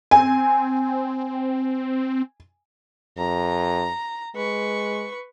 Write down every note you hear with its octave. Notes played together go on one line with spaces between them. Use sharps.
C4 G#5
F2 A#5
G#3 B4 C#6